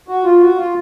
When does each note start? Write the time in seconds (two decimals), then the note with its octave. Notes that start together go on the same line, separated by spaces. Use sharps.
0.08 F#4
0.25 F4
0.41 F#4
0.57 F4